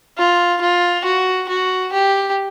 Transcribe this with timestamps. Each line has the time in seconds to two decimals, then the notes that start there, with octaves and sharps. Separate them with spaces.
0.18 F4
0.61 F4
1.05 F#4
1.49 F#4
1.92 G4